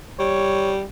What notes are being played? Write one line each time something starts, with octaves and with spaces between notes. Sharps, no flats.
G3 C#5